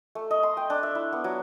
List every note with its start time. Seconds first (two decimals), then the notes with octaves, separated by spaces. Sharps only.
0.15 A3
0.31 D#5
0.43 C6
0.57 G5
0.70 D4
0.83 E5
0.95 E4
1.12 B3
1.24 F#3